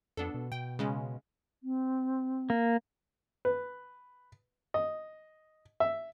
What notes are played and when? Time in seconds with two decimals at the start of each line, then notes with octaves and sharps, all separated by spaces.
0.17 F2 B3 D4 A4
0.34 B2
0.52 B2 G5
0.79 C#3 G#3 C#4
1.63 C4
2.50 A#3
3.45 B4
4.74 D#5
5.80 E5